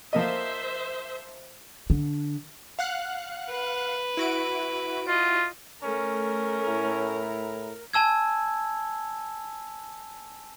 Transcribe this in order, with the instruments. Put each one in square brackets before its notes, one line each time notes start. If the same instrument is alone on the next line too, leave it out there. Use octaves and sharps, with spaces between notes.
[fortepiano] F3 A#3 D#5 [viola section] C5 E5
[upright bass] D3
[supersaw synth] F5 F#5 F#6
[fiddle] B4
[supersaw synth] E4 F#4 D7
[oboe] F4 [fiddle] D#5
[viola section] A3 [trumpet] C#4 [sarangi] A#4
[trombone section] A2 E4
[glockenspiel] G#5 A5 E6 G#6